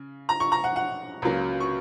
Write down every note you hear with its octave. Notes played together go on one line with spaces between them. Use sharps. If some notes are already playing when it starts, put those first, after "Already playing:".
Already playing: C#3
A#5
C#6
A#5
F#5
F#5
C#2 C#3 F#3 A#3
C#6